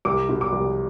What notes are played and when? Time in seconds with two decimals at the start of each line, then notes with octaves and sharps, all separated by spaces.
0.05 C2 D6
0.29 B2
0.41 D6
0.52 C2